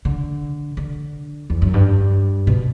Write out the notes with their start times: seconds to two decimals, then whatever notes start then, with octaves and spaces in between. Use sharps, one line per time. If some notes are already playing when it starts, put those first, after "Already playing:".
0.05 D3
0.77 D3
1.50 E2
1.62 F#2
1.74 G2
2.47 B2